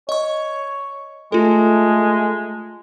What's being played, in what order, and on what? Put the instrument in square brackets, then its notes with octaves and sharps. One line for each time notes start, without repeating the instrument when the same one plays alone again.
[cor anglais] C#5 [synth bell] D#5 C#6
[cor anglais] G#3 [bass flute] A3 [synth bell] F4 A4